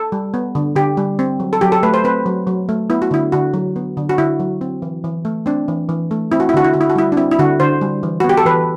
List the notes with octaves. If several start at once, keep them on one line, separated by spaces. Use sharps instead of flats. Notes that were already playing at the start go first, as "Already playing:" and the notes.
Already playing: A4
G3
B3
D3
D3 G4
G3
C4
F#3
A4
F#3 G4
A4
A3 B4
C5
C4 B4
F#3
F#3
A3
B3 E4
F#4
D3 E4
D3 F#4
F#3
B3
D3
F#4
D3 E4
F#3
C4
E3
E3
A3
C4 D4
E3
E3
A3
C4 E4
F#4
E4
D3 F#4
E4
D3 F#4
E4
F#4
G3 E4
D4
C4 E4
E4
D3 F#4
D3 C5
G3
E3
F#4
B3
G4
A4
E3 B4